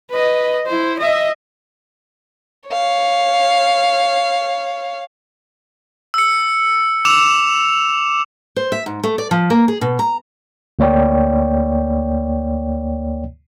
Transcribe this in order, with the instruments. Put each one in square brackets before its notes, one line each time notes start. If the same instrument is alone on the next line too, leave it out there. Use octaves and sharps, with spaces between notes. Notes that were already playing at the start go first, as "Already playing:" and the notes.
[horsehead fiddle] B4 D#5
E4 C5
D#5 E5
[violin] C#5 F5
[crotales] E6 C#7
D6 E6 E7 F7
[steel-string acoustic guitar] C5
E5
G#2
A3
D5
F3
A#3
G#4
B2
A#5
[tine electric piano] D2 A#3 C#5 D5 G5